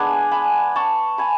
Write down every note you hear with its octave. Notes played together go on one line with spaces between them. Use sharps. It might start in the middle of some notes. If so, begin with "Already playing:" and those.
Already playing: G#3 B3 D4 G#5 B5
G#5 B5
A5 C#6
G#5 B5